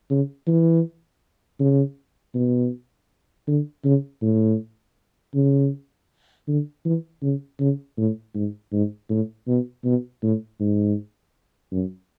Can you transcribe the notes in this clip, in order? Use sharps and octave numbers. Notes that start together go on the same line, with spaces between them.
C#3
E3
C#3
B2
D3
C#3
A2
C#3
D3
E3
C#3
C#3
A2
G#2
G#2
A2
B2
B2
A2
G#2
F#2